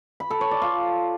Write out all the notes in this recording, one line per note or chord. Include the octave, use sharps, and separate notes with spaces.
B5
A4
C#5
D5
F4